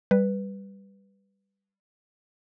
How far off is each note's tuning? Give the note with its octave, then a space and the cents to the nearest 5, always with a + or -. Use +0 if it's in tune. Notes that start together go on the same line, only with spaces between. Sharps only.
G3 +0 B4 -5